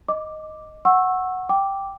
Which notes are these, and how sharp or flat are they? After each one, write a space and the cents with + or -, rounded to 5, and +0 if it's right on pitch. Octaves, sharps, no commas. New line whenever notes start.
D#5 +0 D6 +0
F#5 +0 C#6 -20 E6 +0
G5 +0 D6 -5